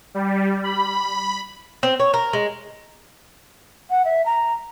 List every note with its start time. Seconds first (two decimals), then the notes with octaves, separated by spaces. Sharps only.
0.14 G3
0.64 B5
1.83 C4
2.00 C#5
2.14 A#4
2.33 G#3
3.90 F#5
4.05 E5
4.26 A#5